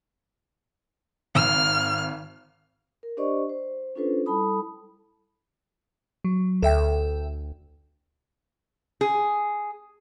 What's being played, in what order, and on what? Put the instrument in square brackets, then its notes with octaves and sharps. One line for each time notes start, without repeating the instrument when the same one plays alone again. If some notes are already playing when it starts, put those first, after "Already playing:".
[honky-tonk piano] G#1 [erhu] F6
[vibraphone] A#4
D4 G4 C5 D5 D#5 C#6
C5
C#4 D4 F4 A4 B4 C5
G3 E4 A4 A5 B5 D#6
[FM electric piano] F#3
[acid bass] D2 [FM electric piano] A4 E5 G5
[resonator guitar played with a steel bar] G#4